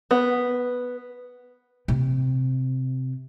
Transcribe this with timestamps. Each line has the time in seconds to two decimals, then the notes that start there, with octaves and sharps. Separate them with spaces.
0.11 B3
1.88 C3